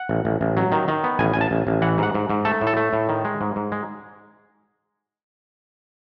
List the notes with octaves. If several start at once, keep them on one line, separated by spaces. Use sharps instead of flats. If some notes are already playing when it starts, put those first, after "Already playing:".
Already playing: F#5
A1
A1
A1
F#3
D#3
D#3
B3
A1 G#5
A1 G#5
A5
A1
A1
E3 F#5
G#2 F#5
G#2
G#2
A3 A4
A2
A4
A3
A2
D#3
G#3
G#2
G#2
G#3